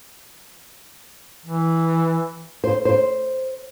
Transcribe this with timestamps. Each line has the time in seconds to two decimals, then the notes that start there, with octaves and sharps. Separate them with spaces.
1.46 E3
2.64 C5
2.85 C5